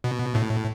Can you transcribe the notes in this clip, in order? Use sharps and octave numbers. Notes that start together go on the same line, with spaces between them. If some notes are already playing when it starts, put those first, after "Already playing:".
B2
A2